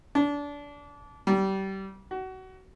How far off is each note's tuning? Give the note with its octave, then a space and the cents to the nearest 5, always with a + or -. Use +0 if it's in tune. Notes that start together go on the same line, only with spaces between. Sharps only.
D4 -25
G3 -25
F#4 +25